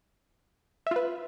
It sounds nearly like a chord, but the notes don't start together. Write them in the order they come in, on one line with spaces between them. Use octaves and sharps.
E5 F4 B4